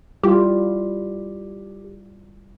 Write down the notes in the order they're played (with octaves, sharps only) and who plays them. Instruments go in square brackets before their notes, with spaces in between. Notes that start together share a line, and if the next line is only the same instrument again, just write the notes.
[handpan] G3 E4 F4 [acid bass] G4